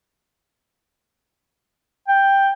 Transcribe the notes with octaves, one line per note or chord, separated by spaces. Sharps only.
G5